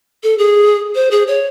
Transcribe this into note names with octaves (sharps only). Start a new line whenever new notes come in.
A4
G#4
C5
G#4
C#5